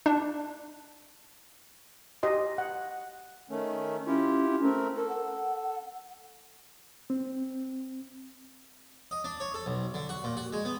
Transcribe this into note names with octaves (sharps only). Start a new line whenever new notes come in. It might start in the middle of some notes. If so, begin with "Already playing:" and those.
D4
G4 D#5 C6
F#5
D#3 A3 C#4
C#4 E4 F4 G4
A3 C4 A#4
A4 A#4
F#5
C4
D#5
D4
C#5
A4
B1
D3
F#4
A#2
F#4
G#3
B3